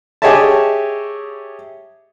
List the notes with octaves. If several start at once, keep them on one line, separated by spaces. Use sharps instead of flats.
G4 G#4 C#5 D#5 E5 A5